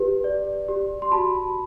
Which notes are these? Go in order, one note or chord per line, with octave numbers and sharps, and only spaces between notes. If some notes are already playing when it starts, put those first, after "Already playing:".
Already playing: G4 B4
D5
G4
C6
F#4 A5 B5